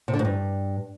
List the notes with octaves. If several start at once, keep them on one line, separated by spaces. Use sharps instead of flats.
C3
D3
G#2
G2